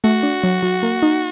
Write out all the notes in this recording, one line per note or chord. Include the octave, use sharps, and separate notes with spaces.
A3 F#4
D4
F#3
F#3
A#3
D#4